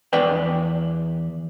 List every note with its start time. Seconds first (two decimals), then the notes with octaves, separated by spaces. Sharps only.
0.13 E2 B4 D5 G5